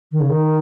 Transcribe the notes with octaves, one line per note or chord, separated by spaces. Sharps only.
D#3
C#3
D#3